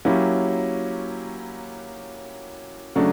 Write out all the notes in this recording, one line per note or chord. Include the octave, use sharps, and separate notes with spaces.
F#3 A#3 C#4 E4 G4
C#3 F#3 A3 D4